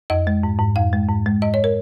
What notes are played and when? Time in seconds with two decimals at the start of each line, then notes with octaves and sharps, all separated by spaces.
0.10 F2 D#5
0.27 G#3
0.43 G#2
0.59 G#2
0.76 F2 F5
0.93 G#3
1.08 G#2
1.26 G#3
1.42 G#2 D#5
1.54 C#5
1.64 A#4